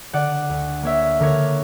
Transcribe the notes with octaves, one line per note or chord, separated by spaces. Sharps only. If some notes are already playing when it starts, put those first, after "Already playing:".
D3 D5 F#5
D2
A#3 C#5 E5
D3 A#4 C#5